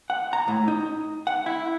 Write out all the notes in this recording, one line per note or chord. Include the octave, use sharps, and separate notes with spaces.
F#5
A#5
A2
D#4
F#5
E4